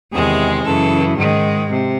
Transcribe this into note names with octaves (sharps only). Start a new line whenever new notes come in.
E2 C3 D#3 G#3 G#4
F#2 C#3 E3 A4
G#2 D#3 G#3
C3